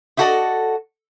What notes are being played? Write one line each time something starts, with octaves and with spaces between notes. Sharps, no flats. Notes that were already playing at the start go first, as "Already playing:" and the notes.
D#4 E4 F#4 A4 D5 D#5